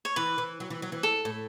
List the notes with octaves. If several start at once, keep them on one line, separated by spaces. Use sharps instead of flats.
C#5
E3 B4
E3
F#3
E3
F#3
E3
A4
A2